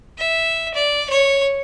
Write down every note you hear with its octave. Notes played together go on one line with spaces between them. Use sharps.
E5
D5
C#5